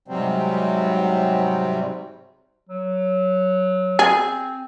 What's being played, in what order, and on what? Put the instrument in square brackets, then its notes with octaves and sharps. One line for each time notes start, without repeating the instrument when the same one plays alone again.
[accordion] G#2 C3 F#3 G3 C4
[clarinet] F#3
[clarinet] C4 [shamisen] G#4